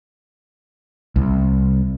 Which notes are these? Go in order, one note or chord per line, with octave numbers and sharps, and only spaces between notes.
C2